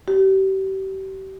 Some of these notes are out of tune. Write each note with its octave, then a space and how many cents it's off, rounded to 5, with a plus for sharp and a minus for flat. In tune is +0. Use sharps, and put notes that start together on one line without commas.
G4 -35